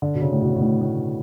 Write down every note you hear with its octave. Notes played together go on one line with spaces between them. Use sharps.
D3
B2
C#3
A2
B2
B2
A2
A2